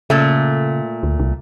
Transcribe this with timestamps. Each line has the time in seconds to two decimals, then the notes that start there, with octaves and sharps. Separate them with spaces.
0.10 A#2 C#3 A3
1.03 D2
1.20 C2